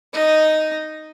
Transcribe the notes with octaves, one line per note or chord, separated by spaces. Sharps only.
D#4 D#5